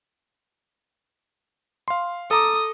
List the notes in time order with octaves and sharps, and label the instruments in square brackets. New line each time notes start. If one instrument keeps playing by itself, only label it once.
[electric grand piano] F5 C6
[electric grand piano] A4 A#5 D6 [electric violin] D#6